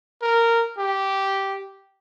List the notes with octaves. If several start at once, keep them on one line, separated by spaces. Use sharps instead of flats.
A#4
G4